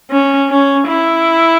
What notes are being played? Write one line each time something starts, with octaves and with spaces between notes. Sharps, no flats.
C#4
C#4
E4